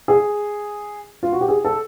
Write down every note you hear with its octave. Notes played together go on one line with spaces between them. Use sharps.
G#4
F4
F#4
G4
G#4
A4